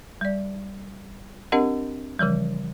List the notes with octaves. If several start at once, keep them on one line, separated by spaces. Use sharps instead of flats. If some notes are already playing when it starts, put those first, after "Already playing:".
G3 D5
C4 D4 G4 A#4 D#5 F#5
C#3 E3 F3 G3